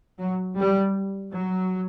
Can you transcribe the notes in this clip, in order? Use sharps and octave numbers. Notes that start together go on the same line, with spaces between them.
F#3
G3
F#3